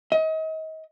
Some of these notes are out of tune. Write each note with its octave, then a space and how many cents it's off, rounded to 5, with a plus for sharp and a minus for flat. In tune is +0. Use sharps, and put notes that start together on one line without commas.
D#5 +35